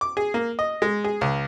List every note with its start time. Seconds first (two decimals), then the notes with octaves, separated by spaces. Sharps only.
0.01 D6
0.17 G#4
0.34 A#3
0.59 D#5
0.82 G#3
1.04 G#4
1.21 C#2